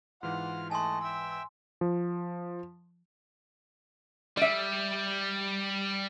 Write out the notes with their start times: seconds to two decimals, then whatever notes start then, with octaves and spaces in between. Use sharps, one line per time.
0.23 G#2 E3 F4 F#5 F6
0.71 A3 D#5 G#5 A5 C6
1.04 E5 G5 E6
1.81 F3
4.37 G3 D5 E5